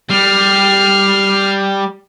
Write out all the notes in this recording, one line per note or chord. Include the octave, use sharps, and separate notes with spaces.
G3 F6 C7